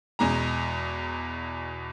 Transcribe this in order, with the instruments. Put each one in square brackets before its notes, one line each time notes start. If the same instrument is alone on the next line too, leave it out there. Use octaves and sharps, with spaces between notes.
[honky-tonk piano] E2 B2 G#3 A#5